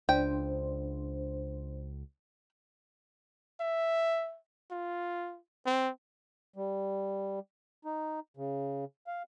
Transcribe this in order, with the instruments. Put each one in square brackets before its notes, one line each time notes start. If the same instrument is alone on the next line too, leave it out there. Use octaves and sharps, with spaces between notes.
[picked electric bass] C#2 [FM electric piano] D4 C5 [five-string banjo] G5
[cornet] E5
F4
C4
[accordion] G3
D#4
C#3
F5